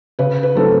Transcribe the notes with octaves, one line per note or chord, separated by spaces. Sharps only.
C#3 B4
B4
F#3 A3 C4 E4 A4